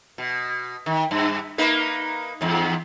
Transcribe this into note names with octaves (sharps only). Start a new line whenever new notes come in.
B2
D#3
G2
A#3 D#4 B4
E2 G#2